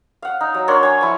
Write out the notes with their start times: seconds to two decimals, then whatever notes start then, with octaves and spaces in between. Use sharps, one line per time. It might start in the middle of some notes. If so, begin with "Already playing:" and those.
0.22 F5 F#5
0.41 D#4
0.54 F#3
0.68 D4 A#4 C#5 C6
0.83 G#5 C#6
1.01 F3 E4